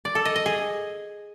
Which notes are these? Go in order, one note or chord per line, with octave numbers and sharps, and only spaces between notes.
D5
A4
D#5
D#5
G#4